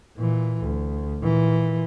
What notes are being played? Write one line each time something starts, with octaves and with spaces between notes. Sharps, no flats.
A#2 E3
D2
A#2 E3